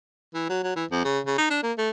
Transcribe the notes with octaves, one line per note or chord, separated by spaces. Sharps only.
E3
F#3
F#3
E3
F2
C#3
C#3
D#4
D4
A#3
A3